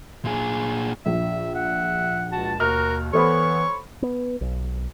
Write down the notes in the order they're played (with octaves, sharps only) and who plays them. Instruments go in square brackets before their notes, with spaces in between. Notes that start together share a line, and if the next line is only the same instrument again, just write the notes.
[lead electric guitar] A#2 G#4
[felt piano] A#1 [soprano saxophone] E5
[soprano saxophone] E5 [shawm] F#5
[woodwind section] C#2 A5 [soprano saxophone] F#4
[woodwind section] D#2 B2 [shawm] F#4 [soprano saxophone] A#4 [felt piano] F6
[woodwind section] E3 B3 [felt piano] A4 C5 B5 [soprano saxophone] C#5 [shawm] C#6
[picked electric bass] B3
B1